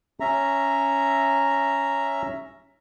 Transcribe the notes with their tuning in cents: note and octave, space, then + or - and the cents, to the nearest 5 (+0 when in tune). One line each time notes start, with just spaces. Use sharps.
C#4 +0 E5 +5 A#5 +0